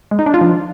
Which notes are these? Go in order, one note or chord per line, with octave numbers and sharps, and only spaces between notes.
G#3
D#4
D4
F4
F3